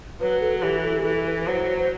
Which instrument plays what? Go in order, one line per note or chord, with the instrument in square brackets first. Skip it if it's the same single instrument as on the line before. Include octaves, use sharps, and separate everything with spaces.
[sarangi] F#3 [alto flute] B4
[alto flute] A4
[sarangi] E3 [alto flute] G4
[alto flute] A4
G4
[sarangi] E3 [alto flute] A4
[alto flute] B4
[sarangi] F#3 [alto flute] C5
[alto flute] C5